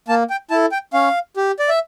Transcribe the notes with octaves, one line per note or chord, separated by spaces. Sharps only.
A#3 A5
G5
E4 A4 A5
G5
C#4 F5
G4
D5
E5